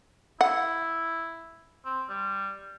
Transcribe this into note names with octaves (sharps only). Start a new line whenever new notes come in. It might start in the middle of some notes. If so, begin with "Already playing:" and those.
E4 F#5
C4
G3